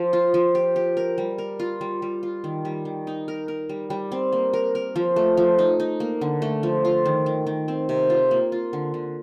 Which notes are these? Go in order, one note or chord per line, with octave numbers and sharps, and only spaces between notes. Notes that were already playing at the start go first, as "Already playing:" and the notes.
Already playing: F3
F4
F3
G4
G4
A#4
G3
A#4
F4
G3
G3
F4
D#3
G3
D#3
D#4
A#4
A#4
G3
G3
C4
A#3
A#4
A#4
F3
A3
F3
D#4
D#4
A#3
D3
A3
F3
F4
D#3
D#3
D#3
C4
C3
F4
A#3
F4
D3
D3